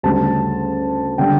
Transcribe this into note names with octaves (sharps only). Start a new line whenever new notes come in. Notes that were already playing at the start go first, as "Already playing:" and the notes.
D2 C#3 G3 A5
D3 G3 G5